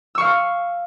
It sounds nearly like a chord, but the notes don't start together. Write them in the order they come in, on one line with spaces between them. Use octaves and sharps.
E6 C#6 F5